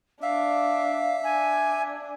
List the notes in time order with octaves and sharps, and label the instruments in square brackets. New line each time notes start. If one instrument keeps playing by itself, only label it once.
[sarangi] D4 [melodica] E5 [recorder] F5
[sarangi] D4 [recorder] G#5